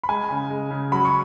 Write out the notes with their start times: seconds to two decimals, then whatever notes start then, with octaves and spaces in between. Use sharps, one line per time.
0.03 B5
0.09 G#3 G#5
0.30 C#3
0.50 G#3
0.71 C#3
0.92 F#3 B5
1.05 C#6